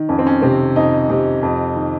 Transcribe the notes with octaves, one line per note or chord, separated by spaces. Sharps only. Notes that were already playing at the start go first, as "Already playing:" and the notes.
Already playing: D#3
F2 C#4
C4
C#4
C3 C4
F2 D#4
C3
F2
D#3